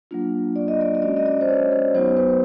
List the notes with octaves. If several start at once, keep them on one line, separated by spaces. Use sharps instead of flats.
F#3 A#3 D4 F4
D5
D#5
D5
D#5
G#3 C#4 F#4 D5
D#5
D5
C5
C#5
C5
F#3 B3 D#4 F#4 C5
B4